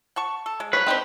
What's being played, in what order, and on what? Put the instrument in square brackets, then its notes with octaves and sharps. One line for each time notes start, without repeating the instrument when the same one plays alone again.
[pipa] F#5 A5 C#6
A4
G#3
[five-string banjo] F#3 C4 C#5 [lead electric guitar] B4
[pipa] D3 D4 C5 [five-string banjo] C4 D#4 G4